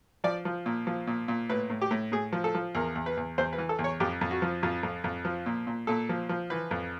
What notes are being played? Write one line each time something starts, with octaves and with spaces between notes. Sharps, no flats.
F3 D5
F3
A#2
F3
A#2
A#2
A2 B4
A2
G4
A2
A2 G#4
F3
A4
F3
E2 A#4
E2
B4
E2
E2 C5
B4
E3
A4
E2
C#5
F2 G4
F2
F#4
F3
F2 F4
F2
F2
F3
A#2
A#2
A#2 A4
F3
F3
E3 B4
F2